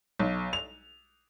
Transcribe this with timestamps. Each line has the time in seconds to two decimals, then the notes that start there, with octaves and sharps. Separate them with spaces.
0.19 B1
0.53 F7